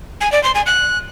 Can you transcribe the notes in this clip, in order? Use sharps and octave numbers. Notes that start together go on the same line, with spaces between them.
G#5
D5
C6
G#5
F#6